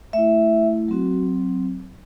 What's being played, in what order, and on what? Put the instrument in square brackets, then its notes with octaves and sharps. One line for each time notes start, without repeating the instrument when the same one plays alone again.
[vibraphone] A3 E4 E5
F#3 C4 F#4